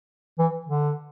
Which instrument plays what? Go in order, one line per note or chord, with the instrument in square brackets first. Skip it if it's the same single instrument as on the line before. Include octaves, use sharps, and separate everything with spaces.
[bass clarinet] E3
D3